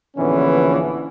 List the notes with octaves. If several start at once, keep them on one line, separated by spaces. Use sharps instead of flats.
A#1 D3 E3 B3 C#4